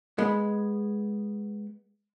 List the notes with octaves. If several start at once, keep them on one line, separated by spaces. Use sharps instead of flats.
G#3 B3